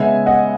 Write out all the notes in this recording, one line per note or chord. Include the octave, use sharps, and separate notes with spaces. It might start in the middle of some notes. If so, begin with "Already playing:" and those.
Already playing: C#3 G#3 B3 E5 G#5
D#5 F#5